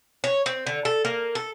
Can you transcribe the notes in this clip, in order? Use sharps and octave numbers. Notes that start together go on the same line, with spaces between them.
C#5
C4
D3
A4
A#3
A4